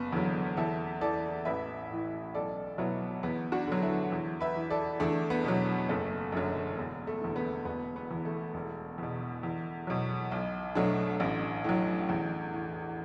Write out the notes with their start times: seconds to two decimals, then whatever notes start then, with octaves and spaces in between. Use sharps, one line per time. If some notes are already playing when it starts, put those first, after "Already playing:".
Already playing: F#1 B3
0.13 E2 D3 F#3
0.57 E2 E4 A4
1.01 E3 A4 D5
1.45 A1 B4 E5
1.90 A2 E3
2.35 B1 A4 D5
2.78 B2 F#3 B3 E4
3.23 E2 B3
3.52 D4 F#4
3.68 D3 F#3
3.82 E4 A4
4.12 E2
4.40 B4 E5
4.56 E3
4.70 A4 D5
5.00 E2 A3 D4
5.30 B3
5.44 B2 F#3
5.89 F#1 A3
6.32 F#2 D3 F#3
6.77 E1
7.07 A3
7.21 E2 D3
7.36 B3
7.65 E1 B3
7.96 B3
8.11 E2 E3
8.25 A3
8.54 E1
8.98 E2 B2
9.43 E2
9.87 B2 F#3
10.32 B1
10.75 B2 F#3 A3 D4
11.20 A1
11.64 A2 F#3
12.09 E2
12.53 E3